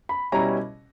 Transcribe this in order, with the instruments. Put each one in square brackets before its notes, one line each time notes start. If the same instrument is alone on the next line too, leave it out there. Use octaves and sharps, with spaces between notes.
[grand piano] B5
B2 G3 C#4 E4 A#5